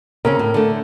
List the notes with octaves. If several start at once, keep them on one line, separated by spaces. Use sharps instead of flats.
C#3 C4 C#4 A#4
A2
D3 A3